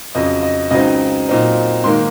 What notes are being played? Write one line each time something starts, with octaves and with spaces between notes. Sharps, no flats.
F2 C#3 F#3 D#5
D#5
C#2 C#3 F#3 C4 D#4 D#5
A#2 F#3 C4 D#4
G#2 D#3 A#3 C6